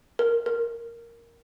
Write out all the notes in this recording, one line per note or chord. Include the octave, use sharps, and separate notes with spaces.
A#4
A#4